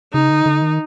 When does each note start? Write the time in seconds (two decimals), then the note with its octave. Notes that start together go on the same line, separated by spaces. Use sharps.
0.13 C#3 D#4
0.29 D3
0.46 D3
0.62 D#3